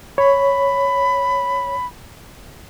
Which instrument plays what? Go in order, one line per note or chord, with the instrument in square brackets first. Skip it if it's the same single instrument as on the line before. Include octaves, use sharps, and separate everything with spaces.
[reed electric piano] C#5 [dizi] B5